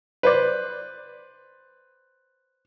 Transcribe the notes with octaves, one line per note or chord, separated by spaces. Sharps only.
B4 C5 D5